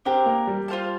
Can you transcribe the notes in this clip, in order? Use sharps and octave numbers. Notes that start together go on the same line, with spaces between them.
C4 D4 G4 A#4
A#3
G3
F4 C5 F5 A5